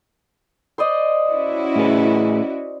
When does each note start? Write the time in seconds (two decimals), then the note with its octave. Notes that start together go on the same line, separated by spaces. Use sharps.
0.78 C5 D5 D#5
1.29 C#4 E4 F#4
1.76 A2 G#4 B4